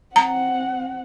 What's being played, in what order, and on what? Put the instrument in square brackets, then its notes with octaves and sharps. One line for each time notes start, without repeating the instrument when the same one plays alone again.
[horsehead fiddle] C4 F#5 [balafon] A#5